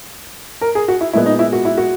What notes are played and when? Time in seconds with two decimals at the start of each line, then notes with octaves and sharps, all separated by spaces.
0.61 A#4
0.75 G#4
0.88 F#4
1.01 E4
1.13 A#2 G#3 B3 E4
1.26 D#4
1.39 E4
1.53 F#4
1.65 E4
1.78 F#4